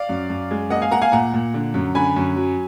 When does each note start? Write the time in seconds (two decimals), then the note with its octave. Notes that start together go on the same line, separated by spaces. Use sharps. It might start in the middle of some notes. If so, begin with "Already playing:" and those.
Already playing: D5 F5
0.09 F#2
0.30 F#2
0.51 G#3
0.70 A#3 D#5 F#5
0.82 F5 G#5
0.91 A#3 F#5 A#5
1.02 F5 G#5
1.12 A#2 F#5 A#5
1.34 A#2
1.54 D3
1.74 F#2
1.95 D3 G#5 B5
2.16 F#2
2.36 F#3